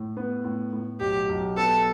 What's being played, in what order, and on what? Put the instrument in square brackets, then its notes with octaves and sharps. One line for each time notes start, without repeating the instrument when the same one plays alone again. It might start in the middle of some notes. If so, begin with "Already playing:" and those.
Already playing: [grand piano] A2
B3
A2
A2
[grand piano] B1 [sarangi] G4
[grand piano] B1
[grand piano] B3 [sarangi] A4